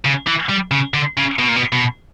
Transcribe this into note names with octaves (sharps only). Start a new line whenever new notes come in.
C#3
E3
G3
C#3
D3
C#3
B2
A#2
B2
B2